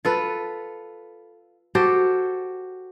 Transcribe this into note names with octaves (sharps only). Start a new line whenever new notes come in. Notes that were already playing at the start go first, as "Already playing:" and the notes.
F4 A4 B4
F#4 G4 A4 C5